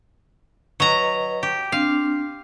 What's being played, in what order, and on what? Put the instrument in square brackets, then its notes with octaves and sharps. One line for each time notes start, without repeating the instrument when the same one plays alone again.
[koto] F#3 A#5 [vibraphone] B4 D#5
[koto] G4
[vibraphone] C4 D4 [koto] F5